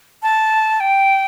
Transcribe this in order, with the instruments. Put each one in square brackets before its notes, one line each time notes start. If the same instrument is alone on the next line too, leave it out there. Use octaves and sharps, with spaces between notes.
[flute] A5
G5